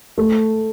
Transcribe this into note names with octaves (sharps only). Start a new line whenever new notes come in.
A3